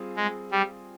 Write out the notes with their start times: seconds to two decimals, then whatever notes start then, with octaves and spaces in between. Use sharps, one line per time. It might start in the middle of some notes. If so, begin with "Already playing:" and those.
Already playing: G3 C4 F4 G#4
0.16 G#3
0.52 G3